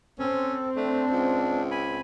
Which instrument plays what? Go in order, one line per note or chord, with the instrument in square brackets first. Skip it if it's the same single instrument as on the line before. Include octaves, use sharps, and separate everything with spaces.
[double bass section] C4 [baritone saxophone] C#4 [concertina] A4
[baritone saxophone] A3 [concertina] D4
[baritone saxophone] C#2
[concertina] G#5 B5